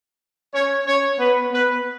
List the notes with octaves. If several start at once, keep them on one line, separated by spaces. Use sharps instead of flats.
C#4 C#5
C#4 C#5
B3 B4
B3 B4